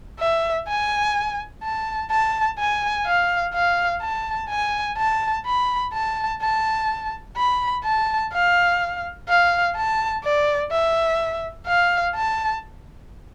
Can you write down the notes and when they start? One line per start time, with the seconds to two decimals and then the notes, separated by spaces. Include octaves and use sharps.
0.19 E5
0.68 G#5
1.63 A5
2.11 A5
2.59 G#5
3.06 F5
3.54 F5
4.02 A5
4.50 G#5
4.98 A5
5.46 B5
5.93 A5
6.42 A5
7.37 B5
7.84 A5
8.33 F5
9.28 F5
9.76 A5
10.24 D5
10.71 E5
11.67 F5
12.15 A5